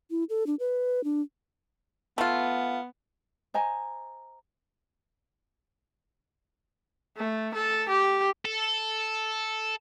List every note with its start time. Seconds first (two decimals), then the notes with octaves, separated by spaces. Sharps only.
0.11 E4
0.30 A4
0.47 D4
0.60 B4
1.04 D4
2.18 A3 B3 F4
3.54 C5 D#5 G#5 A#5
7.17 A3
7.55 A4
7.89 G4
8.45 A4